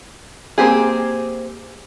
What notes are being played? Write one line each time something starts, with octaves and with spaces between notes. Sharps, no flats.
A#3 C4 G4 G#4